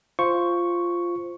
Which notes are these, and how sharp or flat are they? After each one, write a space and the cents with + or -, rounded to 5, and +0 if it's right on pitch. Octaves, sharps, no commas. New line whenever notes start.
F4 -5 C5 +0 C#6 +0